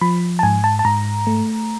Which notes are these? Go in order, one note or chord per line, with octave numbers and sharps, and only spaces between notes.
F3 B5
A5
G#2 G#5
A5
A5
G#2 A#5
A3